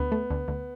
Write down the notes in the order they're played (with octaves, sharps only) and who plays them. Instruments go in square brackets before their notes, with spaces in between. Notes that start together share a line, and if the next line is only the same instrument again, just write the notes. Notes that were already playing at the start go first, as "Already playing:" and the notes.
Already playing: [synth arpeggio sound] D2 [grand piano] B3
[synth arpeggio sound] A3
D2
D2